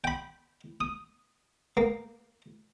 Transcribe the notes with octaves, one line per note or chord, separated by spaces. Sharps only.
G5 B5
D#6
A#3